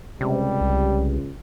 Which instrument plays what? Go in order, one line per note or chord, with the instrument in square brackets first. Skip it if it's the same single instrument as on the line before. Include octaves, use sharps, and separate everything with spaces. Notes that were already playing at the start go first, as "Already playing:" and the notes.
[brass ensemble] C#2 [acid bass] C3 [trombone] G3
[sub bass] C2